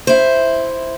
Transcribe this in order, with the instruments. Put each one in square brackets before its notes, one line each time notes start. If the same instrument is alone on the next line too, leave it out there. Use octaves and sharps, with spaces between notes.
[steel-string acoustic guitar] E4 C5